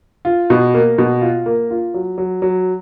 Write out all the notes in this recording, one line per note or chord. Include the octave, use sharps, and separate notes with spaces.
F4
B2
A#3
B2
F4
A#3
F4
F#3
F#3
F#3